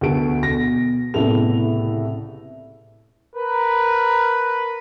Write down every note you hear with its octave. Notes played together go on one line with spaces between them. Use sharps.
D2 B3 F#4 A4 D7
B2 A#6
C2 A2 C#3 B3 A4 F7
A#4 B4